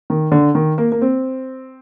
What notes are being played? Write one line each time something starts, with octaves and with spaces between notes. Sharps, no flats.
D#3
D3
D#3
A#3
A#3
C4